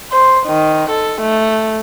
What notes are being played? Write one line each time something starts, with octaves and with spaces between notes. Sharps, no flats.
C5
D#3
A4
A3